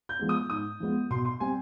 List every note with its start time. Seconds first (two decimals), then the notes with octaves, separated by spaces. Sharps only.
0.09 G6
0.19 F3 G#3 B3
0.29 D#6
0.50 G#2 D#6
0.80 F3 G#3 B3
1.10 B2 C6
1.25 C6
1.40 G3 C4 G#5